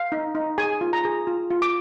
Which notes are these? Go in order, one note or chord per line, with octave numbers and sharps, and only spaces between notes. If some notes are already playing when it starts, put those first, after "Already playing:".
Already playing: F5
D#4
D#4
G#4 G#5
F4
A#5
G#4
F4
F4
D6